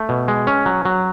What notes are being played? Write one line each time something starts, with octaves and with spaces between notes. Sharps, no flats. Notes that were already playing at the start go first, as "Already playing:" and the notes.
Already playing: A3
B2
G#3
C#4
F#3
F#3